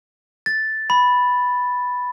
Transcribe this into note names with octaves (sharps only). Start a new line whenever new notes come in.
A6
B5